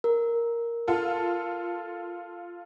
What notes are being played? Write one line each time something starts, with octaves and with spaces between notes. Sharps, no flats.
A#4
F4 A4